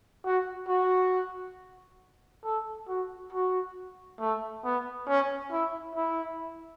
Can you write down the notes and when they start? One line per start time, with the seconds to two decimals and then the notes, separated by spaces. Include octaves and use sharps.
0.25 F#4
0.68 F#4
2.44 A4
2.88 F#4
3.32 F#4
4.20 A3
4.64 B3
5.08 C#4
5.52 E4
5.95 E4